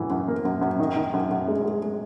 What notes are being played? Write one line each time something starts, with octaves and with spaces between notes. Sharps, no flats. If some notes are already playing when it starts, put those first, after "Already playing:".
Already playing: F#2 E3
F#2
A#3
F#2
F#2
D#3
D#3
F#2
F#2
G#3
G#3
G#3